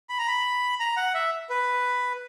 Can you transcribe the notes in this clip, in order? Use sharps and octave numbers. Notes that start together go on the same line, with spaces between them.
B5
A#5
B5
A#5
F#5
E5
B4